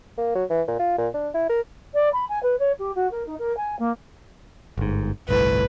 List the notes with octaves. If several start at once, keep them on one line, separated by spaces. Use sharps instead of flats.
A#3
F#3
E3
A#2
F4
A#2
D4
E4
A#4
D5
B5
G#5
B4
C#5
G4
F#4
A#4
D#4
A#4
G#5
A#3
G1 G#2
G1 C2 A2 B4